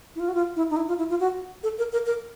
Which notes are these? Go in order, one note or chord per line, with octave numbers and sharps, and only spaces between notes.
E4
F4
F#4
F4
E4
D#4
E4
F4
E4
F4
F#4
A4
A#4
A#4
A#4